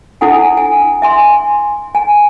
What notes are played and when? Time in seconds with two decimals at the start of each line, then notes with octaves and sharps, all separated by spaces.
0.21 D4 E4 A4 F#5 G#5
0.57 G#5
1.02 E5 G#5 C6
1.95 G#5